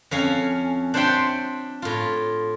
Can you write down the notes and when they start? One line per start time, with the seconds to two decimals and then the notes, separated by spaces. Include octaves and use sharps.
0.11 F2 C#4 F5 G#5
0.94 D4 C5 C#5 E5 G5 C6
1.82 A2 F4